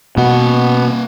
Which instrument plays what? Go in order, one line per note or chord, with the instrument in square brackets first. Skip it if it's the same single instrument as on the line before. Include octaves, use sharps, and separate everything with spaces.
[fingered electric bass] B2 [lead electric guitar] A#3 F#5